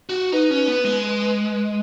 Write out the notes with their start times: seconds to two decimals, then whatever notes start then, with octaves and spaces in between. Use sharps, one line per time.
0.09 F#4
0.32 D#4 B4
0.50 C#4
0.68 B3
0.84 G#3